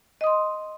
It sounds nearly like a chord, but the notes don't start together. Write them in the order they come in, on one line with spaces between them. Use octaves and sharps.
D#5 D#6 C6